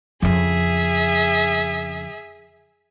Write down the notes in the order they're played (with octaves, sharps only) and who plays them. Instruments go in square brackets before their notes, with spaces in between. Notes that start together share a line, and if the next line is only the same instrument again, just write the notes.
[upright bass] F2 C#3 [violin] G#4 E5